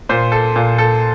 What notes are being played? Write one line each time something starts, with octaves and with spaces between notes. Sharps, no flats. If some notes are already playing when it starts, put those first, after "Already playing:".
A#2 C5
A4
A#2
A4